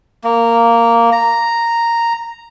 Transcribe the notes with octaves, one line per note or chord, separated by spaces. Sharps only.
A#3
A#5